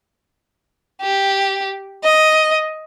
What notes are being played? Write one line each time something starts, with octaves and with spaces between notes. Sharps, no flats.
G4
D#5